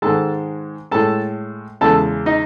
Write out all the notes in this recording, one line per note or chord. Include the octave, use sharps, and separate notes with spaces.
G#2 D#3 G#3 A4 A5
A2 G#3 A4 A5
E2 C#3 G#3 A4 A5
D#4 D#5